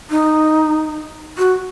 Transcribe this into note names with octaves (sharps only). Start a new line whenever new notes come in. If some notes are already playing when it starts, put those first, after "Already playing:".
D#4
F#4